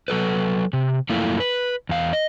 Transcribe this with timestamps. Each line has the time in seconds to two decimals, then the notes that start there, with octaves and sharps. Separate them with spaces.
0.08 F#3 A4 B4
0.73 C3
1.09 F#2 F3 A3 A#3 E4 F4
1.40 B4
1.89 E2 F5
2.13 D#5